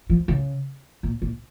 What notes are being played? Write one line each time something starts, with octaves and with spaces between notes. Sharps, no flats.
F3
C#3
A#2
A#2